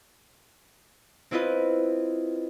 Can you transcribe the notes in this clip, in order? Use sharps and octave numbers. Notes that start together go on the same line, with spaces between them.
C4 E4 F4 B4 D#5